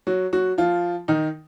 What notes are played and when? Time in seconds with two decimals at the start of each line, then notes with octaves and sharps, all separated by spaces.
0.07 F#3 F#4
0.33 F#3 F#4
0.58 F3 F4
1.08 D#3 D#4